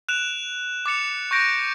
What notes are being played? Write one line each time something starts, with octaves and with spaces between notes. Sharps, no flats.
F#6 D7 E7 F7
D6 A6 C#7 F7
C#6 G6 A#6 D7 F7